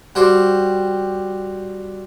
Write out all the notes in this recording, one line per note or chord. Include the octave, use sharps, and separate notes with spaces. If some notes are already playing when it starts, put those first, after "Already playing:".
G3 F#4 G4 C5